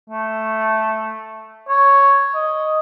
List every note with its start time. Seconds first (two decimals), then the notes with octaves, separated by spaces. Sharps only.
0.10 A3
1.68 C#5
2.35 D#5